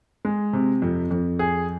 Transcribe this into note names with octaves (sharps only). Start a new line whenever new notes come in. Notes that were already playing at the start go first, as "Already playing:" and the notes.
G#3
C3
F2
F2
G#4